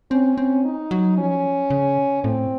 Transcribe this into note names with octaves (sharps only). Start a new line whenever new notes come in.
C4 C#4
C4
D#4
F#3
F3 C#4
C#3
A2 C4